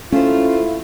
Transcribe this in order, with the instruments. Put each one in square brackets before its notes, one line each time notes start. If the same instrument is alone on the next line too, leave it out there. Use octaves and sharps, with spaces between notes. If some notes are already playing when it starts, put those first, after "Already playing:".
[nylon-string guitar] A3 C5 [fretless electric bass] C#4 [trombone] E4 [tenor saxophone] F4